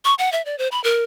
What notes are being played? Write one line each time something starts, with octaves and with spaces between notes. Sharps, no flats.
C#6
F#5
E5
D5
C5
B5
A#4